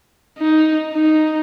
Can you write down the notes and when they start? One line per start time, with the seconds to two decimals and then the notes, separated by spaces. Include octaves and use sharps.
0.39 D#4
0.94 D#4